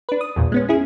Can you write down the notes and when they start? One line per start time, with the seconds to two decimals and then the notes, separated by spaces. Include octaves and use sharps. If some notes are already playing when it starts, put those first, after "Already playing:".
0.09 D4 B4
0.21 D#6
0.36 A#1 E2 A#2
0.52 G#3 B3 C#4
0.69 C#4 E4 G#4